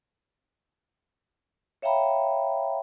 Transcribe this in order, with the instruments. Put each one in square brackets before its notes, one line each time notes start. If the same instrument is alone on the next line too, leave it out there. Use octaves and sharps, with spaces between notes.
[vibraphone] C#5 E5 F5 G5 A#5 B5